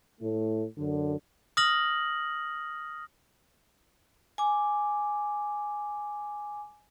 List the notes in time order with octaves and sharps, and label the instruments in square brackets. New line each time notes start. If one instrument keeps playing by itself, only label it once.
[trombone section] A2 A3
F#2 D3
[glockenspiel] D#6 F6 A#6 F#7
[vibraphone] G#5 D6